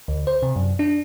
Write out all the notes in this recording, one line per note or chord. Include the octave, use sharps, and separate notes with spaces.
D2
C5
C3
F#2
D4